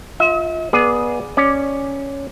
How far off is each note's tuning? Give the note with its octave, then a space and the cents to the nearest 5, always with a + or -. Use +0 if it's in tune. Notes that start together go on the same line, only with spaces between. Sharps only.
F4 +0 E5 -45
B3 -25 G#4 +0 D5 +0
C#4 +0 D5 +0